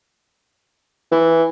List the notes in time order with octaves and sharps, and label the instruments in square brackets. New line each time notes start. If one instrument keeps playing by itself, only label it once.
[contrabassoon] E3